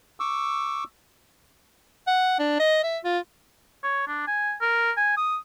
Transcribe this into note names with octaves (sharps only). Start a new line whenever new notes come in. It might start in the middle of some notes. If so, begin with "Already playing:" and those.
C#6 D6 E6
F#5
D4
D#5
E5
F4
C#5
D4
G#5
A#4
G#5
D#6